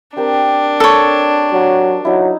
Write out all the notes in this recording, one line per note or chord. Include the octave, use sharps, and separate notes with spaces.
C4 D4 G4 A#4
A4 C#5
F#3
F#3 D#4 E4